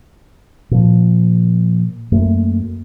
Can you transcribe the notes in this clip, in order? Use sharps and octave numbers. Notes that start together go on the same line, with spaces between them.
A#2 F3
F#2 A3 A#3